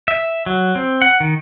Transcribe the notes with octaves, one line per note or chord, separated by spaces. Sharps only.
E5
F#3
C4
F#5
D#3